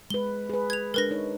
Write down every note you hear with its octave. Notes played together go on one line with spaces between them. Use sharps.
G#3 B4 G7
G#4 B4
G#6 F7
G#3 D4 A#4 B4 A#6
D#4 C#5